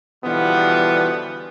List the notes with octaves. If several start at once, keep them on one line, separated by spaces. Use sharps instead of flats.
B2 D3 E3 F3 G3 B3